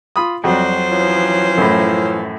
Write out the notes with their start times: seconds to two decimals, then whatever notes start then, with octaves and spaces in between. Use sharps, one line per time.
0.16 F4 B5 D#6
0.44 F2 F#3 G3 F#4 C5
0.90 E3 F3 C#4
1.57 F#2 A2